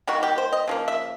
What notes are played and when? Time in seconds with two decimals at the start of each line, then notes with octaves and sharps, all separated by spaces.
0.07 D#3 G3 A#3 F#4
0.23 G4
0.38 C5
0.52 D#5
0.68 C#3 F3 A#3
0.88 E5